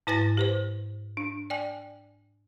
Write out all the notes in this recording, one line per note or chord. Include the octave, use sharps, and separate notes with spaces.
G#2 E4 B4 G#5 A6 A#6
G4 B4 C5
D4
D5 G5 G#5